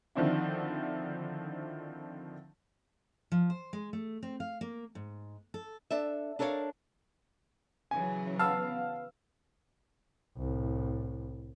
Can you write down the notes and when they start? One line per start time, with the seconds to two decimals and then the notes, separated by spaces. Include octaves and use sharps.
0.15 D3 D#3 F3 C4 D4 E4
3.32 F3
3.50 C5
3.73 G#3
3.93 A3
4.23 C4
4.40 F5
4.61 A#3
4.95 G#2
5.54 A4
5.91 D4 A4 E5
6.39 D4 A4 A#4 C#5 D5 F5
7.91 C#3 E3 F#3 G#5
8.39 B3 F5 A5 E6
10.37 C2 A2